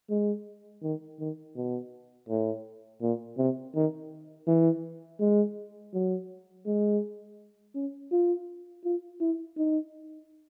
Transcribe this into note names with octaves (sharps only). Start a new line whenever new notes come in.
G#3
D#3
D#3
B2
A2
A#2
C3
D#3
E3
G#3
F#3
G#3
C#4
F4
F4
E4
D#4